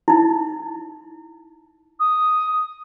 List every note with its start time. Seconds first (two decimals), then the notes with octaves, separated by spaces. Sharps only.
0.08 D#4 E4
1.99 D#6